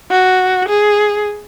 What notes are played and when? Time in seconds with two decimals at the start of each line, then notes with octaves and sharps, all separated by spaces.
0.11 F#4
0.69 G#4